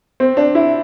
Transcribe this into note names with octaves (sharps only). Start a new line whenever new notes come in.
C4
D4
E4